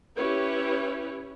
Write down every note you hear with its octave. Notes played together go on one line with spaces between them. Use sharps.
C#4 E4 G4 B4 C#5